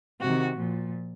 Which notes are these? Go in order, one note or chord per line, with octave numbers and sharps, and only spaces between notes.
C3 D#3 F#4
A#2 F3